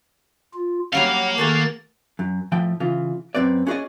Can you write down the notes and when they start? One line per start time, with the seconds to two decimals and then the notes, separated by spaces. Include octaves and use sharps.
0.54 F4
0.93 F#3 G3 A#3 C#4 F5 F#5
1.38 D#3 A3 F#4 G#4 A6
2.19 F#2
2.52 A2 F3 G5
2.80 C#3 E3 F4
3.35 F#2 B2 C4 B4 D5
3.67 C#4 F#4 G#4 A#4 D5 D#5